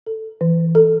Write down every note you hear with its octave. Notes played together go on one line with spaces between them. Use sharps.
A4
E3
A4